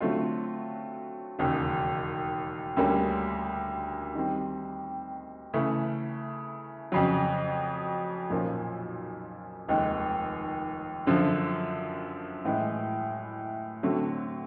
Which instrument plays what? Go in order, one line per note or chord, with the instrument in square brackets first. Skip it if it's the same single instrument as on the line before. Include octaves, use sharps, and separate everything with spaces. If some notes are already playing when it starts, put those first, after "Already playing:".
[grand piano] D3 F#3 A3 C4 F4
E1 D#2 C#3
D2 D3 G3 A#3 C#4
D#3 G3 C4
C#3 E3 A3
F2 C#3 F#3
B1 A#2 F3 A#3 C#4
F1 D#2 D#3 G#3
F#2 D3 F3
A2 E3 G#3
D3 F#3 A3 C4